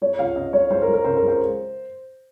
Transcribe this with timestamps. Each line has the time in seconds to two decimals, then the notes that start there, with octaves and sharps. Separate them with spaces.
0.01 G#3 C#5
0.19 C#2 F5
0.36 C#3 D#5
0.53 G#3 C#5
0.70 G#3 C5
0.82 A#4
0.88 G#3
0.94 A#4
1.05 C#3 C5
1.17 A#4
1.22 G#3
1.28 C5